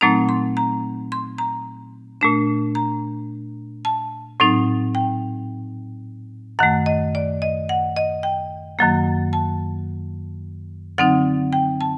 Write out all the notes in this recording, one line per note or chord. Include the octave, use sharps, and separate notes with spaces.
A#2 F#3 A3 C4 D#4 A#5
C6
A#5
C6
A#5
A#2 A3 D4
A#5
A5
A2 F#3 C4 D#4
G5
F#2 D#3 A3 F#5
D#5
D5
D#5
F#5
D#5
G5
F#2 D#3 F#3 A#3
A5
D3 F#3 C4 D#4 F#5
G5
A5